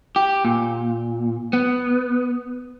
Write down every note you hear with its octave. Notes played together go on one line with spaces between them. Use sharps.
G4
A#2
B3